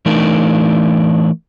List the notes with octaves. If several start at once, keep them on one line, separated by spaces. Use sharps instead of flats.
E3 A3 D4 D#4 A#4